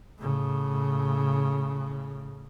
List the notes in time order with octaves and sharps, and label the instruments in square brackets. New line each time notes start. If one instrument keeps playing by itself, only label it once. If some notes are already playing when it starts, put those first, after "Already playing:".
[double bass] A2 C#3